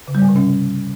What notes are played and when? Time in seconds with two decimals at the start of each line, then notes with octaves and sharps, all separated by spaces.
0.08 C#3
0.15 G3
0.22 G2
0.29 C3
0.36 C#4